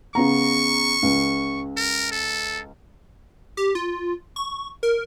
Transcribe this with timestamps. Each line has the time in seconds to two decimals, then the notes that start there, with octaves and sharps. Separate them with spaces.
0.15 C#3 B3 A#5 C#6
1.03 C#2
1.77 A#4
2.12 A4
3.57 G4
3.75 F4
4.36 C#6
4.83 A#4